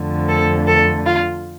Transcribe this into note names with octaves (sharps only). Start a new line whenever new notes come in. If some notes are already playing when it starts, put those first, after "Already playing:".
Already playing: F2 D3 A3
A4
A4
F4